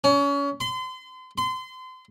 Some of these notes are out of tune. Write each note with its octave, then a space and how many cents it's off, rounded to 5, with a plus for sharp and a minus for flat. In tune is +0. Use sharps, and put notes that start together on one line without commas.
C#4 +30
C6 -35
C6 -30